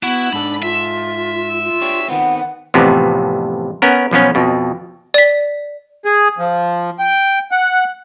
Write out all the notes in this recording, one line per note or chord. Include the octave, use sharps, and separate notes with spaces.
B3 E4 F#4
G#2 D4 A4 B5
F4 E5
F4
D4 G4 C#5
D#3 B3 C4 F#5
A1 F2 A2 C3 B3
B3 C#4 A#4
B1 F3 B3 C#4
F2 B2
D5 B6
G#4
F3
G5
F#5